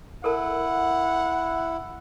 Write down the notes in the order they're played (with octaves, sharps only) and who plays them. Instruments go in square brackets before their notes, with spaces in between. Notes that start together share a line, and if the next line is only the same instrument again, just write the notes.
[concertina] E4 [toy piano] A4 A#4 A5 [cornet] F#5